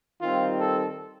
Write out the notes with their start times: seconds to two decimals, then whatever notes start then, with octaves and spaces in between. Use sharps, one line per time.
0.20 D#3 G3 C4 F4
0.61 A4